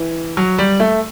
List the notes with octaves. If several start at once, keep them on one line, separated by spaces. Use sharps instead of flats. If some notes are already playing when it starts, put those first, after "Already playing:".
Already playing: E3
F#3
G3
A3